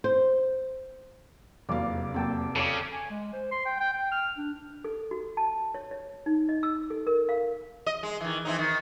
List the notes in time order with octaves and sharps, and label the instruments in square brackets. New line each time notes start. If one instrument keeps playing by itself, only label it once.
[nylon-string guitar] C5
[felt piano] F1 E2 F5 [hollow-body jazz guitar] C3 F#3 A#3 [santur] D5
[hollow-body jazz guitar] F#3 A#3 C4 [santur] A4 G5 A5
[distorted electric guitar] C#3 [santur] A4 D5 [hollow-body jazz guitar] C#5 A5
[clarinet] G#5
G#3
C5
C6
G5
G5
G5
F6
D4
[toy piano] A4
F#4
A5
C#5
C#5
D#4
D#5
E6
A4
A#4
F5
[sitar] D#5
G#3
D#3 E3
E3 C4 D#4
D#3